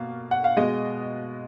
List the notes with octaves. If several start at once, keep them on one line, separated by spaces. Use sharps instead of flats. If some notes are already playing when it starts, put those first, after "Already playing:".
Already playing: B2 A#3 F5
F#5
F5
B2 G#3 D#5